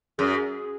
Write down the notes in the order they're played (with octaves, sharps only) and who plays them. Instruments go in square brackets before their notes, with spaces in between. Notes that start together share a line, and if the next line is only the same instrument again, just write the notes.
[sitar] F#2 [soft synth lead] G#4